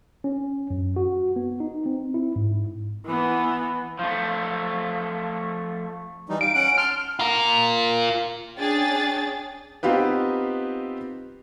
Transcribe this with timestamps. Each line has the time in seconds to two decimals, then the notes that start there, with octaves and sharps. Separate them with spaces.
0.24 C#4
0.70 F#2
0.96 F#4
1.36 B3
1.60 D#4
1.86 C4
2.14 E4
2.36 G#2
3.06 E3 B3
3.99 F3 A3
6.29 E3 G3 D#4
6.41 F5 D7
6.54 C#4 F#5 F#6
6.78 A5 C6 F6
7.19 F4 A#4
8.58 C#4 D4 G#4 G5 A6
9.83 B3 C4 D#4 F4 G4 B4